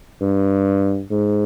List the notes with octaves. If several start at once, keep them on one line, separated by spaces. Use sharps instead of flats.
G2
G#2